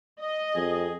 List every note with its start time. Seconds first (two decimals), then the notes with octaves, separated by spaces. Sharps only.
0.19 D#5
0.55 F2 G#4